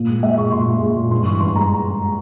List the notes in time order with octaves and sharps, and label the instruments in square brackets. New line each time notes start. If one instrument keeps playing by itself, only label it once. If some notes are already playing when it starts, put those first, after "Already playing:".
Already playing: [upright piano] A#2 A#3
G#3
G#3 E5
A#2 C#6
A#2 C6
G#3
G#3
A#2
G2 C6
E3 C#6
G2 C6
G#3 A#5